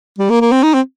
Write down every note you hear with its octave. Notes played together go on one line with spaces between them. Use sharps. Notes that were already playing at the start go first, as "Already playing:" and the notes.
G3
A#3
A#3
C4
D#4
C4